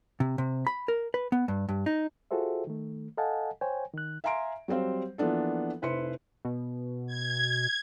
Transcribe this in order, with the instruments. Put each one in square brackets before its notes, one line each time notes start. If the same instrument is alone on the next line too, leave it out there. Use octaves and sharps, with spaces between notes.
[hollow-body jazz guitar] C3
C3
B5
A#4
B4
B3
G2
G2
D#4
[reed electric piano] F4 F#4 G#4 A4 C5 E5
D#3 A3
A4 D#5 F5 F#5 G#5 A5
C5 C#5 G5 G#5
D#3 F#6
[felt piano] E5 F5 G#5 A#5 C6 D7
F#3 G3 C4 C5 F5
E3 F3 A#3 B3 D4 A4
F1 E4 B4 C5 C6 C#7
[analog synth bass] B2
[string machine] G#6